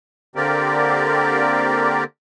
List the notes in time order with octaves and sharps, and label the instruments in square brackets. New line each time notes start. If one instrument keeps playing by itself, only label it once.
[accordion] D3 A#3 C4 G4 A#4 D5